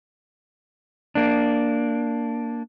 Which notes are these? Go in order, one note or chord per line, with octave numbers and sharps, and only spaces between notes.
A#3 D4